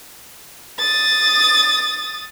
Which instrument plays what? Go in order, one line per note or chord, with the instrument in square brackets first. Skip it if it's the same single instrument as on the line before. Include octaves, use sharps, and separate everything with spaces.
[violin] D#6 A6